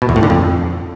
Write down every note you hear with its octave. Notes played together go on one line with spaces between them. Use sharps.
B2
E2
A2
D3
F2